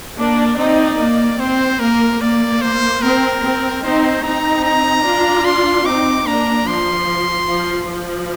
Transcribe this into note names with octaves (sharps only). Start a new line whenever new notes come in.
A#3 D4 D5
C4 D#4
A#3
C4 C5
A#3 A#4
A#3 D5
C5
C4 A#4
C4
C4 D#4 C5
C4 D#4 A#5
A#5
D4 F4
C6
C4 D#4 D6
A#3 D4 A#5
F3 C6
F3
F3